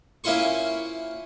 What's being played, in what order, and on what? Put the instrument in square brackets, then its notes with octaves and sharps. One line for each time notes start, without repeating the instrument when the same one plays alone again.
[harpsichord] A#3 C#4 E4 F4 C5 C#6